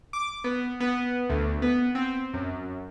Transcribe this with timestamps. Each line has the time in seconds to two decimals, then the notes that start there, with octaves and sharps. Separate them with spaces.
0.13 D6
0.44 B3
0.80 B3
1.29 D2
1.62 B3
1.95 C4
2.34 F#2